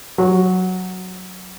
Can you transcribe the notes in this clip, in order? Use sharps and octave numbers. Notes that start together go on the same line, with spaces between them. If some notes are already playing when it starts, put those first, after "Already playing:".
F#3